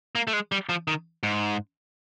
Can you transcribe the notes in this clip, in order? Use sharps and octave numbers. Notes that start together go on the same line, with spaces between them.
A#3
A3
G#3
G3
F3
D#3
G#2